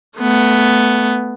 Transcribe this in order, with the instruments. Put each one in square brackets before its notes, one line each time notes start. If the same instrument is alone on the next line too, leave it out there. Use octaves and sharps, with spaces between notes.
[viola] A3 B3